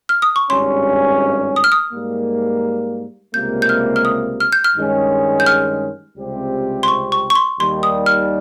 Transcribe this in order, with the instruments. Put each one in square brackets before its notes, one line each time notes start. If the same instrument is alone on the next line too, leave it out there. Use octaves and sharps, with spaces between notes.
[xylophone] F6
D#6
C#6
[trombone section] G#1 G2 G3 C#4 [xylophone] C6
[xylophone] D#6
F6
D#6
[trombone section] G#2 G3 A#3
[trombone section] C#2 C3 G3 A#3 [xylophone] G6
[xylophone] G6
F6
F6
D#6
F6
G6
F6
[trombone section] G2 D#3 G#3 C#4
[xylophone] G6
F6
[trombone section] C#2 C3 G3 C4 G4
[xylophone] C6
C#6
C#6
C#6
C6
[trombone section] D#2 D#3 G3 [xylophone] C6
[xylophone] D#6
F6